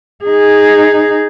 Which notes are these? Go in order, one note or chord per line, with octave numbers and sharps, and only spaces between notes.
D#4 G#4